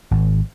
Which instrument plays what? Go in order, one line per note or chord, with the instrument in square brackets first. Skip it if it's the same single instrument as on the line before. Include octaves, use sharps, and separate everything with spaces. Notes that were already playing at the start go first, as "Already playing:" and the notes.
[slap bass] G#1